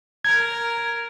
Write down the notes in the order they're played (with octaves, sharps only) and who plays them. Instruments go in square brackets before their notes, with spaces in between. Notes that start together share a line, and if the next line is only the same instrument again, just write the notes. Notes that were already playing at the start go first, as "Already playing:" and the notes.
[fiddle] A#4 [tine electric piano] G#6